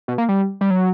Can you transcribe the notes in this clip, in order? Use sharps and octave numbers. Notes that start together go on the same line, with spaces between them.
B2
A#3
G3
G3
F#3